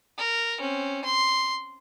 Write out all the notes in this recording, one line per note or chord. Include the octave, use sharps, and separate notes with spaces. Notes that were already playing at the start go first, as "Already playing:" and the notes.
A#4
C4 C#4
C6